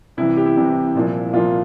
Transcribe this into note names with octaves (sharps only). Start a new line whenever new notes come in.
C2 C3 E3 E4
G4
E4
C2 C3 E3
C2 A#2 F3
C2 A#2 F3 F4